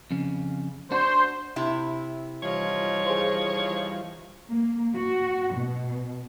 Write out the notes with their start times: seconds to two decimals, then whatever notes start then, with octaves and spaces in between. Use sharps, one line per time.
0.11 F2 C#3
0.92 D4 F#4 C5
1.56 C3 E4
2.43 E3 F3 G3 D#4 F4 C#5
3.06 G#4 C5
4.47 A#3
4.95 F#4
5.54 B2